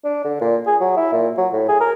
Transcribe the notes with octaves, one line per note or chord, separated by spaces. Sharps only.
D4
D3
A#2
G#4
F#3
E4
A#2
F#3
A2
G#4
A#4